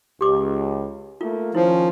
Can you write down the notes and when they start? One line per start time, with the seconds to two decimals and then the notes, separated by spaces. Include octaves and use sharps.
0.21 C#2 G4 D6
1.21 A3 A#3 F4
1.55 D#3 F3 C#4 E4